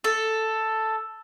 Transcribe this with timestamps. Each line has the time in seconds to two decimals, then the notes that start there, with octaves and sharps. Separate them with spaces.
0.04 A4